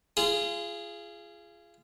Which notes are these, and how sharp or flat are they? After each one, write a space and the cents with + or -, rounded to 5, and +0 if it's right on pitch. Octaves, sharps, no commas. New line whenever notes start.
F4 -30 G#4 +0